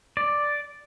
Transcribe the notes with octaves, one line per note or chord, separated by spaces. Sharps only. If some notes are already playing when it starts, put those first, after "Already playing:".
D5